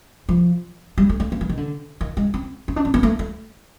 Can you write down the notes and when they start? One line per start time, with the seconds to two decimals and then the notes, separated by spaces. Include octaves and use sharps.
0.29 F3
0.98 G3
1.09 A3
1.20 A3
1.32 A#3
1.41 E3
1.49 D#3
1.57 D3
2.01 D#3
2.17 G#3
2.34 C4
2.68 C#4
2.76 D4
2.85 C4
2.94 B3
3.03 A3
3.19 A3